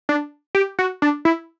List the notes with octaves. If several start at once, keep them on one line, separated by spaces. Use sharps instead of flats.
D4
G4
F#4
D4
E4